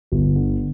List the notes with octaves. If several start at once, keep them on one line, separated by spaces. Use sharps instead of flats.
G1
D3